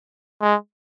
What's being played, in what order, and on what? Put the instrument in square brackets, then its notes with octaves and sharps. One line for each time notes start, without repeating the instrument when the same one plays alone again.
[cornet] G#3